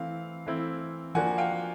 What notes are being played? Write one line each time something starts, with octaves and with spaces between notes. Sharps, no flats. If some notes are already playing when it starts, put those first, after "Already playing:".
Already playing: E3 A3 C4 E4 F5
E3 A3 C4 E4
F3 A#3 D4 F#4 F#5 G#5
F5 G5